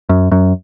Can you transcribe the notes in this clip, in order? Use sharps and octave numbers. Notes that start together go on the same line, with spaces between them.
F#2
F#2